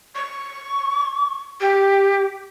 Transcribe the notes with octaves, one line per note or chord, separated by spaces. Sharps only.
C#6
G4